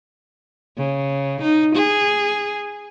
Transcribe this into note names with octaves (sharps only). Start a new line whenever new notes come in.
C#3
D#4
G#4